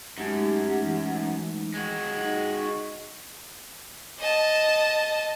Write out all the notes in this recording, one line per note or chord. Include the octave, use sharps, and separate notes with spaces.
F#2 G#3 A3 D#4 G4
E3
G#3 F#4
D#4 D#5
D#5 A5